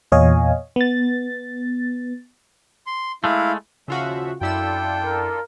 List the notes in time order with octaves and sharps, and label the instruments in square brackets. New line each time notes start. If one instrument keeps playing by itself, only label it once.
[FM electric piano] E2 A#2 C#5 D#5 F5 G#5
B3 A6
[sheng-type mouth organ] C6
[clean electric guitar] G#3 A3 [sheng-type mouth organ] E4 F5
[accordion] D#2 F3 E5 [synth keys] C#3 F4 F#4
[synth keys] F#2 E4 E6 [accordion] D4 F4 A4 [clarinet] G5
[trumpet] A#4